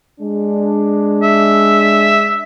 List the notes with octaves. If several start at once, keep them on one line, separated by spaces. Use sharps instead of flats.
G#3 D4
E5